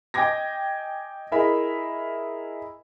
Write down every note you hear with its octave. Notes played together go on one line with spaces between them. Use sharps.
D#5 G5 G#5 D6 G#6 A#6
E4 G#4 A#4 D#5 E5 B5